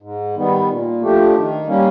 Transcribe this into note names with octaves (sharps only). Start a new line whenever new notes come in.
G#2
D#3 G3 B3
A#2
F3 A3 D4 G4
D#3
G3 A#3 C#4